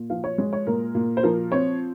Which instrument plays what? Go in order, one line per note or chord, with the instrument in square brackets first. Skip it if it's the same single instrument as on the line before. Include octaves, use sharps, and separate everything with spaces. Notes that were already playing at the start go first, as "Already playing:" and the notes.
Already playing: [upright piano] A#2
F3 F5
C#5
G#3 C#5
C#5
A#2 A#4
A#2
C5
F3 A#4
C4 C#5